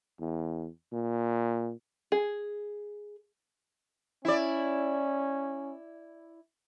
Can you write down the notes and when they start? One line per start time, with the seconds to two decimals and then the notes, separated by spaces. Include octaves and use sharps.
0.20 E2
0.93 A#2
2.12 G#4
4.25 C#4 E4 D5